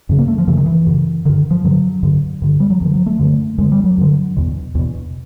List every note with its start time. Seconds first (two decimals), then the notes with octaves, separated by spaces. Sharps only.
0.09 F#2 C#3
0.19 A#3
0.28 A3
0.38 F3
0.47 F#2 C#3 E3
0.57 D#3
0.66 E3
0.86 F#2 C#3
1.25 G2 D3 D#3
1.51 F3
1.64 G2 D3 F#3
2.03 G2 D3
2.42 G2 D3
2.60 G3
2.70 F#3
2.81 F#2 D3 F3
2.94 F#3
3.06 A3
3.19 F#2 D3
3.58 F#2 D3 G#3
3.72 G3
3.84 F#3
3.98 F#2 D3
4.37 E2 B2
4.75 E2 B2